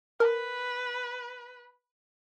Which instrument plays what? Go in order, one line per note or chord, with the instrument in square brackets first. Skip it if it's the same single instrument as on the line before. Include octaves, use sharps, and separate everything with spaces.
[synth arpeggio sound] A#4 [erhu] B4